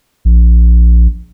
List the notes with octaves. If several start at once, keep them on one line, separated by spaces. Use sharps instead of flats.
A#1